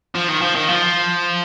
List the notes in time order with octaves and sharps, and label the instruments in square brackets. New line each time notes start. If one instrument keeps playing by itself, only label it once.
[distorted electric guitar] F3
D#3
F3
D#3
F3